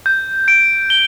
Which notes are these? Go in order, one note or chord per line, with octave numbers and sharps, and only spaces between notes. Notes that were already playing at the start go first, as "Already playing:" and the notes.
G6
D7
G7